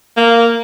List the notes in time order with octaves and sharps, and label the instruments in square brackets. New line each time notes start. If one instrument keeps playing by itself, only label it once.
[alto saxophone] A#3